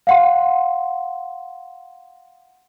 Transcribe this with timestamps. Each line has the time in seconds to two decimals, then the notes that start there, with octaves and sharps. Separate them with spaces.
0.07 F5 F#5 C6